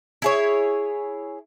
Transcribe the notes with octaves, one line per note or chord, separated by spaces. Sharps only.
E4 G#4 C#5